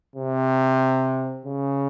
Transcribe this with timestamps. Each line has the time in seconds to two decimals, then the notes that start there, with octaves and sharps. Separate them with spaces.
0.16 C3
1.46 C#3